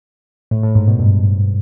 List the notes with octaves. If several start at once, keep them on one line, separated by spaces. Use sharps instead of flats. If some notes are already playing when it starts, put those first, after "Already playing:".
A2
A2
G#2
B2
G2